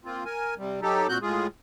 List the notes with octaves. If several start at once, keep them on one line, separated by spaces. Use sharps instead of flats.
A#3 C4 F4
A#4 G#5
C3 G3
F#3 D#4 G4 A4
A#2 C4 F#4 F#6 G6
A2 G#3 F4 G#4